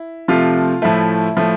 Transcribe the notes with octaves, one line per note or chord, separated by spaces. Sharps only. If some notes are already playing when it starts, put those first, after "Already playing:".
Already playing: E4
C3 F3 A3 F4
A2 F3 A3 E4
A2 F3 A3